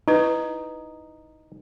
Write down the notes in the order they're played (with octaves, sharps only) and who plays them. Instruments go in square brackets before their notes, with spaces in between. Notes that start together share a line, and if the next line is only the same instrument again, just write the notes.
[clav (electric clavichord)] D#4 [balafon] E4 B4